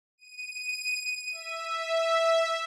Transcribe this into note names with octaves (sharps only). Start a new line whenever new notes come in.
D#7
E5